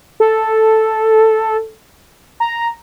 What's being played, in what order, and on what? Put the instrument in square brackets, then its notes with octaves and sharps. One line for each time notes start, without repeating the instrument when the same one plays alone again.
[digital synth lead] A4
A#5